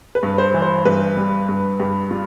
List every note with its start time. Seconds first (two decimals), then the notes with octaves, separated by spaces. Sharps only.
0.15 B4
0.23 G2
0.38 C5
0.54 E3
0.62 C5
0.85 G2 B4
1.17 G3
1.49 G2
1.79 G2 G4
2.11 G3 F4